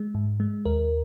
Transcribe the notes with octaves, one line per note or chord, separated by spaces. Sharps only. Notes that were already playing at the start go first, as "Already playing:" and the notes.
Already playing: G#3
G#2
G#3
D#2 A#4